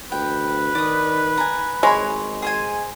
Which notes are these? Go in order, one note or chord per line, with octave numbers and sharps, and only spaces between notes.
D2 B4 G5
D#3 D5 D#6
G#5 A#5
G#1 G#3 C#5 G#5 B5
G#4 C5 G#5